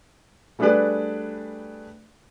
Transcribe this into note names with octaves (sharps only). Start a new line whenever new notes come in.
G3 A3 D4 G#4 B4 D5